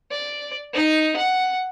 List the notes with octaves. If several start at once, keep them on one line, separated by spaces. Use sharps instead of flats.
D5
D#4
F#5